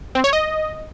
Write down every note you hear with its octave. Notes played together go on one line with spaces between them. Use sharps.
C4
C#5
D#5